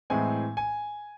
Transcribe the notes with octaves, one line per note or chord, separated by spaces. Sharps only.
A2 E3 G#3 C4 G#5
G#5